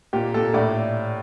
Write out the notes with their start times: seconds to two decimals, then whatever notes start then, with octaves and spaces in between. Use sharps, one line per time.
0.13 A#2 G4
0.34 A#2 A4
0.54 A2 D5